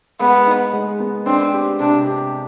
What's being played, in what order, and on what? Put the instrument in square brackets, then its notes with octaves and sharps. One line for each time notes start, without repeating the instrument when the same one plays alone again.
[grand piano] G#3 [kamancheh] B3
[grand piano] D#4
G#3
B3
[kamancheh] C4 [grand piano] D4
[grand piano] G4
[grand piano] C3 [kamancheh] D4
[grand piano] G4